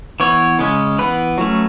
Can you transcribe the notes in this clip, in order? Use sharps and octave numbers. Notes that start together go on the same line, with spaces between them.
E3 B3 C#5
C#3 G#3 C#4
E3 B3 B4
F#3 A3 C#4